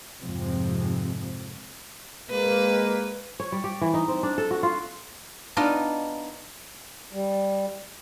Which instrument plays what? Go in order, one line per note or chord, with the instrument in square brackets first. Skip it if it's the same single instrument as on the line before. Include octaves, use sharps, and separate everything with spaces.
[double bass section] F2 G#2 C3 F3 G#3 C4
[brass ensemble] G#3 A#3 [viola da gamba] B4
[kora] C#5
G3
G4
E3
D#4
C4
D4
A4
F#4
F4
[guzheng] B3 D4 D#4 F4 D#5
[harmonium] G3